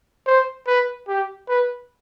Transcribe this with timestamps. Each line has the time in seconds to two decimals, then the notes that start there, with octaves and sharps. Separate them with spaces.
0.27 C5
0.67 B4
1.08 G4
1.48 B4